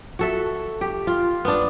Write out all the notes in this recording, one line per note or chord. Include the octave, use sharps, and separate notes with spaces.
F#4 A4 E5
G4
F4
B3 D4